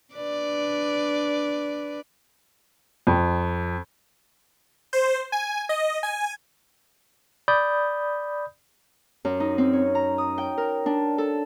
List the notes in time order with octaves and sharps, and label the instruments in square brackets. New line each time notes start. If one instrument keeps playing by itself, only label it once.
[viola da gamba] D4 B4 D5
[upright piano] F2
[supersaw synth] C5
G#5
D#5
G#5
[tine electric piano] D5 B5 D#6 G6
[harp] F#2
D#4
C4
C#5
A#5
D#6
G5
A#4
D4
A4